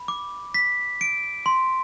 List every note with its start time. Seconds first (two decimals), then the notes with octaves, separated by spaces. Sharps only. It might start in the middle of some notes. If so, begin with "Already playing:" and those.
Already playing: B5
0.08 D6
0.54 B6
1.01 D7
1.46 C6